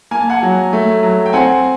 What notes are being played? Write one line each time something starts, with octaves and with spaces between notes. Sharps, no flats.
A#3 G#5
A5
F#5 G#5
F#3
A3
F#3
G5
C4 F#5 G#5